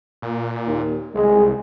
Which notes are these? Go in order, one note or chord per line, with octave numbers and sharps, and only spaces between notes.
A#2
D#2
C2 G#3